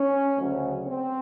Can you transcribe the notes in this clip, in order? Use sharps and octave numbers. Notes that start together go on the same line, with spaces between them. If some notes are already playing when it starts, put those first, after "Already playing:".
Already playing: C#4
D2 C#3 F#3
C4